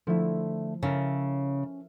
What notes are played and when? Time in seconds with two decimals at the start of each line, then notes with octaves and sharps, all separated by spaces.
0.07 D3 F3 A3 E4
0.83 C#3 C#4 A4 A#4 E5